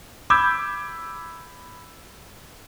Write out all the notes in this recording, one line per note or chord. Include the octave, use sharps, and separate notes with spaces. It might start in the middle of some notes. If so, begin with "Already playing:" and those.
B5 D6 E6 G6 G#6